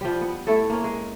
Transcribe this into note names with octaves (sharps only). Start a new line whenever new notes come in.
F3 G3
B3
A3 E4 A4
A#3 C#4
G#3